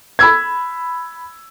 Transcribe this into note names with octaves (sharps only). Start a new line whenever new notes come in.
B5 E6 G#6